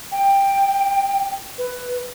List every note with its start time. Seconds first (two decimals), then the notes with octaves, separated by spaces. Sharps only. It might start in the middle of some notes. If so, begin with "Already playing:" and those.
0.12 G5
1.58 B4